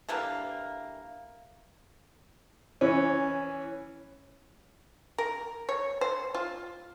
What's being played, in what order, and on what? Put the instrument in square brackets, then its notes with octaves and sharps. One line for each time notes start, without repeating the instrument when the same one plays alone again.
[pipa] D3 E3 G3 A#3
[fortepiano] E3 C#4
[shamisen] A#4
C#5
C5
F4